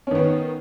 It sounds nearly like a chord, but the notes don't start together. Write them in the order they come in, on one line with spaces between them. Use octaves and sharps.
C#4 D#3 B3